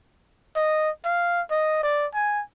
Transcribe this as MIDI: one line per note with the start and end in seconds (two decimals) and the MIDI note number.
0.56 0.90 75
1.05 1.41 77
1.51 1.82 75
1.83 2.06 74
2.14 2.42 80